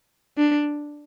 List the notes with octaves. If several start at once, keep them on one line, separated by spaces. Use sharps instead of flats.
D4